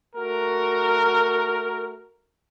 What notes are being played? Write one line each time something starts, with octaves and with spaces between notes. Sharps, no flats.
A3 F#4 A#4